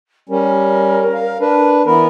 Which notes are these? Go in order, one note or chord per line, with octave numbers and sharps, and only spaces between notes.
G3 C#4 A#4
F5
D4 B4
E3 B3 A#4 B5